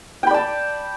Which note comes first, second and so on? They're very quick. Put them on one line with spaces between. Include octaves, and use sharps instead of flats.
G5 B5 D5 A5